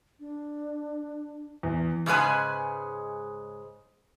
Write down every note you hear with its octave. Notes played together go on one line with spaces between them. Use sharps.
D4
E2
G#2 C#3 G#3 B4 G#5